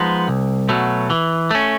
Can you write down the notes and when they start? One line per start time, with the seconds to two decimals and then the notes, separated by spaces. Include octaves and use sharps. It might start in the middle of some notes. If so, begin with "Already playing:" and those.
Already playing: F3 G#3 B3 D#4
0.28 C2
0.69 B2 F#3 A3
1.10 E3
1.51 A3 C#4